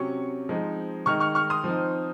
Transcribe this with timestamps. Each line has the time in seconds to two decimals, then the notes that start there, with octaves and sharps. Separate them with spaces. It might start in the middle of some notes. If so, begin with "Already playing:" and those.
Already playing: C3 F#3 C#4 C#6
0.49 F3 G#3 C4 D#4
1.06 D#3 G#3 D#4 C#6 F6
1.20 C#6 F6
1.35 C#6 F6
1.50 C6 D#6
1.64 F3 C4 D#4